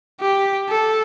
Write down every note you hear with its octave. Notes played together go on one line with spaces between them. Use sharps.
G4
A4